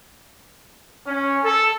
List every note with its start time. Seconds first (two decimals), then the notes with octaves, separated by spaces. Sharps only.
1.06 C#4
1.44 A4